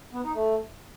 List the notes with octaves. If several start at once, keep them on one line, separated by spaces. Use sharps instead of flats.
B3
D#4
A3